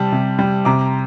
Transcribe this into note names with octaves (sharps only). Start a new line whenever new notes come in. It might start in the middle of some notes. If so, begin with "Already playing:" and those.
Already playing: C3 G3 A5
C3
G3
C3 A#5 D6